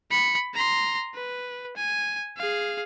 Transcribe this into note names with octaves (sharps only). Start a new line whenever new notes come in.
B5 C#7
A#5 C6
B4
G#5
G#4 F5